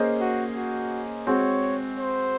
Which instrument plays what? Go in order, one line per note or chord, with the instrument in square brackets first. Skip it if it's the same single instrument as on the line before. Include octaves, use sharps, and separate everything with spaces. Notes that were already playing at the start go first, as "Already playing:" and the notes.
Already playing: [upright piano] A#3 C#4 G#4 C5 D#5
[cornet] F#4
F#4
[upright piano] G#3 C4 F#4 [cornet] C#5
[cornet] C5